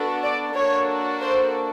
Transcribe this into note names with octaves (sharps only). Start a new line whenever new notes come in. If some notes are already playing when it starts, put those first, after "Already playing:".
Already playing: B3 D4 F#4 A4
D5
A#3 D4 F#4 A4 C#5
C5